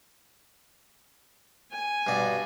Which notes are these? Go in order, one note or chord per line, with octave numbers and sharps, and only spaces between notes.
G#5
G2 B2 D5